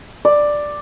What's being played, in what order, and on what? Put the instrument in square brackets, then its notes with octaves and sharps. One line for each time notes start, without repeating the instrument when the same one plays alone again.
[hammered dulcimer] D5